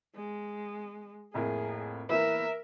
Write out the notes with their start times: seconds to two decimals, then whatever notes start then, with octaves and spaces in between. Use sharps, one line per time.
0.15 G#3
1.34 F2 A2 A#3 G#4
2.09 E3 A#3 A#4 B4 E5